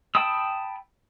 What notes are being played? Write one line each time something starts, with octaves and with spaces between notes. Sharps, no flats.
G5 A5 B5 D#6 E6